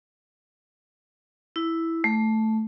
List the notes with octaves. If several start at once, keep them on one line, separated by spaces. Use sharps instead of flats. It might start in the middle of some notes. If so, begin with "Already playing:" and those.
E4
A3